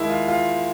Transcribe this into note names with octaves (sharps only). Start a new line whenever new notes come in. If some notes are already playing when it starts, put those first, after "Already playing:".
Already playing: D#2 D#3 G#3 E4
F4
F4